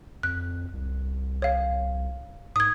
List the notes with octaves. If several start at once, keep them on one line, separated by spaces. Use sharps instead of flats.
F2 F#6
C2
C#5 F5
G#2 D#6 G#6